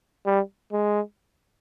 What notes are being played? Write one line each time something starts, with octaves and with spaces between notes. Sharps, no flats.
G3
G#3